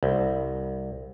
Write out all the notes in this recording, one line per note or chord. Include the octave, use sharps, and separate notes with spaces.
C2